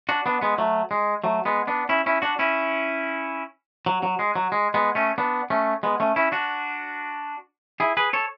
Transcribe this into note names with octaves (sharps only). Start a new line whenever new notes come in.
D4 F#4
B3 D4
G#3 B3
F#3 A3
G#3
F#3 A3
G#3 B3
B3 D4
C#4 E4
C#4 E4
D4 F#4
C#4 E4
F#3
F#3
G#3
F#3
G#3
G#3 B3
A3 C#4
B3 D4
A3 C#4
G#3 B3
A3 C#4
C#4 E4
D4 F#4
E4 G#4
G#4 B4
A4 C#5